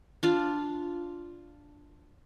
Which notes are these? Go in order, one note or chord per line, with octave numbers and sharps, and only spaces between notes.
D4 F4 F5